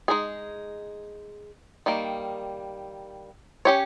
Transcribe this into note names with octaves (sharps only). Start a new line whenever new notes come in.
G#3 D#4 G#4
D#3 G3 A#3
C#4 G4 C#5